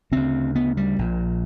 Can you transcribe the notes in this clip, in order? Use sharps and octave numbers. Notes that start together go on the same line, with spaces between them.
D2 C#3 C4
B3
G3
A#1 A#2